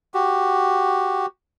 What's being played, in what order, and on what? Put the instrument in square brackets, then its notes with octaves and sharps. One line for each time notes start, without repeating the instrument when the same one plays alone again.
[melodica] F#4 G4